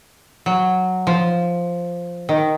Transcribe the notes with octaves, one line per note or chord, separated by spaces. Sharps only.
F#3
F3
D#3